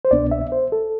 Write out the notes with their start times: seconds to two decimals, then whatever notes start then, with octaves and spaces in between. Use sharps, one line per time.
0.05 C5
0.11 C2 B2 B3 D4 D5
0.31 E5
0.52 C5
0.72 A4